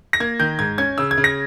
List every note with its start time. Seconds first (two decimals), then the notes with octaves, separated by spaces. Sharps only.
0.13 A#6
0.20 A#3 G#6
0.39 D#3 G6
0.59 G#2 G#6
0.78 C#4 G#6
0.98 C#3 E6
1.11 G#6
1.17 C#3
1.24 A#6